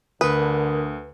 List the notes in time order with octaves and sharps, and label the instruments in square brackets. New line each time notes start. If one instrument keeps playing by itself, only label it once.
[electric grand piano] D2 D#6 [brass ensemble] D3 [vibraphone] A#4 [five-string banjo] B4